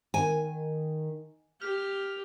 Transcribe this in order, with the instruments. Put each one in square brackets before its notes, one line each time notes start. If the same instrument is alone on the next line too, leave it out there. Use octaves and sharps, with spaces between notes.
[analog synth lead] D#3 [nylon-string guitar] G#5
[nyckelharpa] G4 [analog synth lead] F6